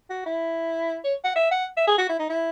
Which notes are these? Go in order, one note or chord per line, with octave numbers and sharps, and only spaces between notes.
F#4
E4
C#5
F#5
E5
F#5
E5
G#4
F#4
E4
D#4
E4